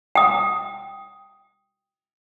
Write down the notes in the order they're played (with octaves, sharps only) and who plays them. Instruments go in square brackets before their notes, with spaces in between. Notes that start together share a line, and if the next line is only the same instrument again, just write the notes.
[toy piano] G5 D#6